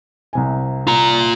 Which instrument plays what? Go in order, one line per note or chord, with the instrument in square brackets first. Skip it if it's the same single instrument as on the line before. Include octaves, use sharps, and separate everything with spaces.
[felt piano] C2 C3 G#5
[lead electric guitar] F4 A#5